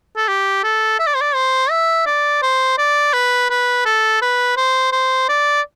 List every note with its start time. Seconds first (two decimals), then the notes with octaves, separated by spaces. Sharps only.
0.17 A4
0.28 G4
0.63 A4
0.99 E5
1.07 D5
1.14 C5
1.21 D5
1.35 C5
1.70 E5
2.06 D5
2.42 C5
2.78 D5
3.13 B4
3.50 B4
3.85 A4
4.22 B4
4.57 C5
4.92 C5
5.29 D5